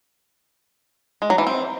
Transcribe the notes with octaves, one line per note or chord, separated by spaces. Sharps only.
G#3
F#3
E3
C4